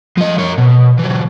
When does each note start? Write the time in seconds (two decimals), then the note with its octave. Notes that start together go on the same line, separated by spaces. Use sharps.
0.17 F3 D#5
0.38 A#4 C#5
0.58 B2
0.99 E3 F#3